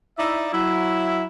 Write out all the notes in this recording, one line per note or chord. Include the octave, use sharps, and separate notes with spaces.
D#4 E4 D5 E5
F#3 E4